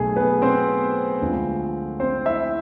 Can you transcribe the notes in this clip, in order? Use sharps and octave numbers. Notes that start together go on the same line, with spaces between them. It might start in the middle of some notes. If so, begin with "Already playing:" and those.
Already playing: B1 B2 A3 G#4
B3 B4
C4 C5
D2 D3 F3 G#3 C4
C4 C5
E4 E5